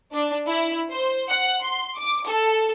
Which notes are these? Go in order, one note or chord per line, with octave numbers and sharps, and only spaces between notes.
D4
E4
C5
F#5
C6
D6
A4